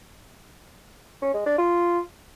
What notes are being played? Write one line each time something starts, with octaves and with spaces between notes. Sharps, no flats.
C#4
G#3
D4
F4